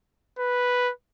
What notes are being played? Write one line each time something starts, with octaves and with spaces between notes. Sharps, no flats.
B4